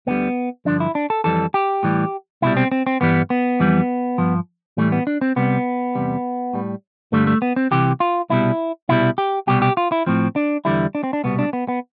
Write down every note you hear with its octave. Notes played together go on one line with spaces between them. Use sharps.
D2 D3 G3 B3
G2 D3 F3 D4
E4
D4
A4
F2 E3 G3 A4
G4
A2 E3 G3
C2 B2 G3 E4
C4
C4
C4
G2 E3 G3 B3
B3
F2 E3 G3
G2 F3
A2 E3 G3 A3
B3
D4
C4
C2 C3 G3 B3
E2 C3 G3
A2 G3
G2 D3 G3 A3
A3
B3
C4
C2 C3 E3 G4
F4
C2 B2 G3 E4
C2 B2 G3 E4
G4
C2 B2 G3 G4
G4
F4
E4
A2 F3 C4
D4
E2 D3 G3 E4
D4
C4
D4
C2 B2 G3 B3
D4
B3
B3